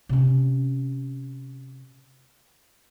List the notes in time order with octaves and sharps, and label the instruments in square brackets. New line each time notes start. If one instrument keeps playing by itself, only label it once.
[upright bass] C3 C#4